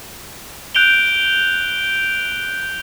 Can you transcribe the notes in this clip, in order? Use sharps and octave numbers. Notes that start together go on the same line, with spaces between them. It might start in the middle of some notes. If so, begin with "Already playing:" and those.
F#6 G6 D7 F7 G7